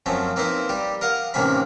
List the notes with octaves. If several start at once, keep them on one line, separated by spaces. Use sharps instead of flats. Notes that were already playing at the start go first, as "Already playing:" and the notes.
F#2 F3 A3 C4 C#4
A#3 C4 D#4 E4 B4 C5
G3 G4
A#4 D#5 F5 F#5
A1 C3 D#3 A#3 C#4 B5